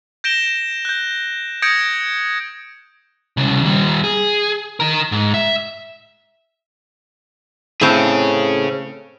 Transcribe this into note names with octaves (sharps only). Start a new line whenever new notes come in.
G6 A#6 D7 E7 G7
F#6 G6
D#6 G6 G#6 A#6 C#7 D7
C2 C#3
D#2 G3
G#4
D#3 A#4
G#2
E5
A2 C4 G#4 C#5